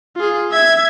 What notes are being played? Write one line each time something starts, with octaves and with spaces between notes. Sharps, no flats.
F4 G#4
E5 G#6